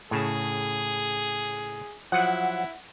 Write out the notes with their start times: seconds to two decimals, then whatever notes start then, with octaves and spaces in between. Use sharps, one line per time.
0.11 A2 C#3 G#4 A5
2.12 F3 F#3 E4 F#5